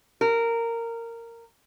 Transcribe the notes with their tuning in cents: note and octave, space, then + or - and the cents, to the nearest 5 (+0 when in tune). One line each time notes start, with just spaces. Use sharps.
A#4 -15